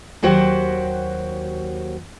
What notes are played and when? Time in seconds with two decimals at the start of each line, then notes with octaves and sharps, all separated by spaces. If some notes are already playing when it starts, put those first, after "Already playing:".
0.23 D#2 F#3 F#4 G4 C5 F#5